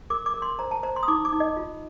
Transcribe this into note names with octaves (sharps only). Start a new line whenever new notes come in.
A#4 D6
D6
A#4
C6
C5 A#5
A5
C5 A#5
C6
D#6
D#4 D6
D6
D#4
D#5
F4